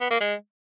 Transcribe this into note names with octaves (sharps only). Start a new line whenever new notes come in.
B3
A#3
G#3